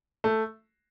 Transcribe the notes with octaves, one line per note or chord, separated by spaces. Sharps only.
A3